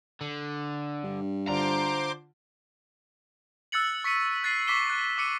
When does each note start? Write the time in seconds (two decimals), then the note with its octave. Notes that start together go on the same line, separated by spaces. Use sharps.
0.21 D3
1.04 G2
1.49 D3 D4 F4 C5 A#5 C6 D6
3.72 E6 F#6 A6 C#7 F#7
4.04 C#6 B6 C#7 D#7
4.44 F#6 A6 B6 C7 D#7
4.67 C#6 D6 B6 C7 E7 G7
4.90 F#6
5.18 D6 E6 C#7 D#7